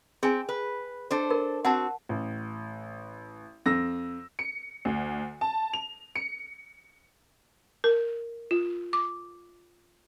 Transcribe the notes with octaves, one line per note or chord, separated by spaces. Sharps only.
C4 G#4 G#5
B4
D4 A4 C5
A#4
C4 F#4 F#5 A5
A1
F2 E6 A#6
C#7
D2
A5
F7
C#7
A#4
F4
D6